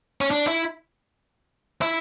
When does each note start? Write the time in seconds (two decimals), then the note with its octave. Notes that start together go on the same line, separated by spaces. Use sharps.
0.21 C#4
0.31 D4
0.47 E4
1.82 E4